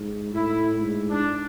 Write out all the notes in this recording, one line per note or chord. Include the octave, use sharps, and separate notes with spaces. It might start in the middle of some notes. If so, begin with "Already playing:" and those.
Already playing: G#2
A2 E4
G#2
D4